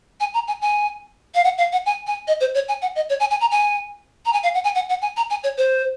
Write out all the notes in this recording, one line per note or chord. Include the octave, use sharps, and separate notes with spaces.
G#5
A#5
G#5
G#5
F5
F#5
F5
F#5
G#5
G#5
D#5
C5
C#5
G#5
F#5
D#5
C#5
G#5
G#5
A#5
G#5
A#5
G#5
F5
F#5
G#5
F#5
F#5
G#5
A#5
G#5
C#5
C5